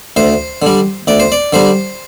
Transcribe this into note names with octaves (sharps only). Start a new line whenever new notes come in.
D2 C5
D3 G3
D2 D5
C5
D5
D3 G3 C5